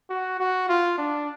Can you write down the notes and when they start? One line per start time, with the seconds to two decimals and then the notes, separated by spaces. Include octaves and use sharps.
0.10 F#4
0.40 F#4
0.69 F4
0.98 D4